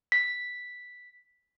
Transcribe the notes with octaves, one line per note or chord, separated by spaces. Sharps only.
B6